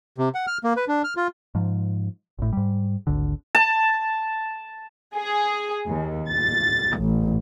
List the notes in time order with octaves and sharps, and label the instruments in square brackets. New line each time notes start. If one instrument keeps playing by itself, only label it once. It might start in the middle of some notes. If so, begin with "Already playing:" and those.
[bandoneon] C3
F#5
F6
A#3
B4
D4
F6
F4
[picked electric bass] G#2 F3
G#1 A2
G#2 G3
G#1 D2 D3
[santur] A5
[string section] G#4
D#2
A6
A1